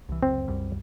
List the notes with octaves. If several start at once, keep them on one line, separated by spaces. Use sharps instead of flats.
C2 E3
F1 C#2 F#2 C4
C2 F#2 G3